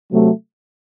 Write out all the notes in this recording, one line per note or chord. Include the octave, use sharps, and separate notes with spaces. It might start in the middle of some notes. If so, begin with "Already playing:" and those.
C3 F#3 A3